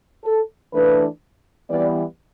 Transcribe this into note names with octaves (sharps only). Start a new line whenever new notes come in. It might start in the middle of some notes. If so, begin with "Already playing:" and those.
A4
E3 A3 D4 B4
E3 G3 B3 D5